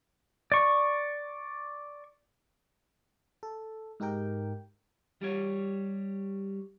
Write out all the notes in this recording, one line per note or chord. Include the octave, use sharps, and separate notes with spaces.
D5 C#6
A4
G#2 D#4 G4 A#4 G5
G3 G4 C#5